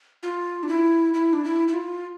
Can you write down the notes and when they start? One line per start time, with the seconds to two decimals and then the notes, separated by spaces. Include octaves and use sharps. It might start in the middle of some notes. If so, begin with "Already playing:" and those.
0.23 F4
0.63 D4
0.69 E4
1.14 E4
1.33 D4
1.44 E4
1.68 E4
1.74 F4